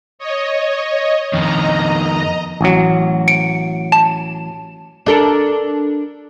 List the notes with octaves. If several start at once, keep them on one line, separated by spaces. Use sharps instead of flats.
C#5 D#5
F2 D#3 D#5 A#5
A1 F#3
C#7 D7
A5
D4 A4 A#4